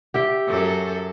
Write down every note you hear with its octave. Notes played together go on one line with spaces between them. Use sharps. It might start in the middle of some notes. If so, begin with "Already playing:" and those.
G4 E5 G5
F#2 A4